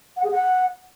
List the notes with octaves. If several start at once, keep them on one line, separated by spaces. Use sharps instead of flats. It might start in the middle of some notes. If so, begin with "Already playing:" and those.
F#5
G#4
F#5